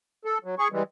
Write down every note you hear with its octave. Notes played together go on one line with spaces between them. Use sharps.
A4
F#3
G#4 C#6
E3 G3 G#3